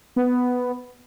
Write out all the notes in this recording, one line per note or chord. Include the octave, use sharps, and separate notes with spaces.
B3